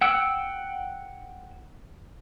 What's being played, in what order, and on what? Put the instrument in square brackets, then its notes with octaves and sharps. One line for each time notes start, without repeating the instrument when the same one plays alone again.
[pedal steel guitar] F#5 G5 E6